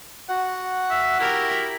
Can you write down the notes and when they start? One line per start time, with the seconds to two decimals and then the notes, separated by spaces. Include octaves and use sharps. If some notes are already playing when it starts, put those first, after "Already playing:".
0.29 F#4 F#5
0.91 E5
1.20 E4 G4 A#4